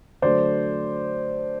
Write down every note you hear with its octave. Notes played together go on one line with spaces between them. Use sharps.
D3 F#3 A3 C5 D5